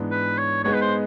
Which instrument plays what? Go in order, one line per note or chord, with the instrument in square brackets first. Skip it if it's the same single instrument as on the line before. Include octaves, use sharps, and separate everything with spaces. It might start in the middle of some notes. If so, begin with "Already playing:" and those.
Already playing: [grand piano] G#2 E3 G#3 B3 D4
[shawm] B4
C#5
[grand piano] G#3 B3 D#4 G#4 [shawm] C#5
[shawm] B4
C5